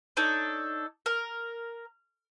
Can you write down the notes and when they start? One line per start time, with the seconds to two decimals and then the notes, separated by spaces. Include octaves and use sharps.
0.17 D4 D#4 A4 C#5
1.06 A#4